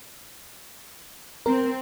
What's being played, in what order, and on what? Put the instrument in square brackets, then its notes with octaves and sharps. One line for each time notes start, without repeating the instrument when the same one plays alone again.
[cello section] C4 [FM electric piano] A#4